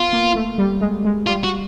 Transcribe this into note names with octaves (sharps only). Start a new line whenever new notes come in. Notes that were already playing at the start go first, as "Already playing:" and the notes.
Already playing: B3 F4
A#3
A3
G3
G#3
G#3
G3 F4
F#4